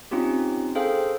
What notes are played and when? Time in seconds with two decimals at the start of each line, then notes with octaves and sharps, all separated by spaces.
0.11 C4 C#4 D#4 F4 G4
0.75 G#4 A4 C5 F5 G5